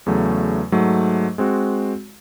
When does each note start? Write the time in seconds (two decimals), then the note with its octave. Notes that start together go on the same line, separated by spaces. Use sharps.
0.06 E2 C#3 F#3 A3
0.72 G#2 F#3 A3
1.38 G#3 C4 F#4